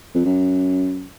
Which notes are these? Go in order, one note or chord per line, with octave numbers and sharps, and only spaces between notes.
F2
F#2